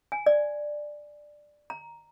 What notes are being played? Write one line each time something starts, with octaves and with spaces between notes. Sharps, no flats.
G#5
D5
A#5